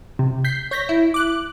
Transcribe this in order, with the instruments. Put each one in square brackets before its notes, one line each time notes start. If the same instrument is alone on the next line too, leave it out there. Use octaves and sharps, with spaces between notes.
[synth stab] C3
G6 B6 C7
C#5 G6 A#6 B6
E4
D6 F#6